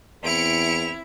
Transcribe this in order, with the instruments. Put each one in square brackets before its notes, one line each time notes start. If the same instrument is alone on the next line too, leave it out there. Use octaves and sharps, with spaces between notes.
[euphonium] E2 [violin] C4 F7 [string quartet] E4 [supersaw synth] C#7 D7